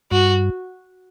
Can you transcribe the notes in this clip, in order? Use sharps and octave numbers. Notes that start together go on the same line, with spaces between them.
G2 F#4